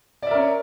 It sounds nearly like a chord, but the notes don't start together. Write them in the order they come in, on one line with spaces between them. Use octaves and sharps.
D5 E5 A#4 C#4